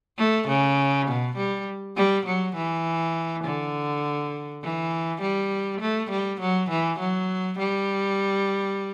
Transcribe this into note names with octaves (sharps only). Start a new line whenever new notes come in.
A3
C#3
B2
G3
G3
F#3
E3
D3
E3
G3
A3
G3
F#3
E3
F#3
G3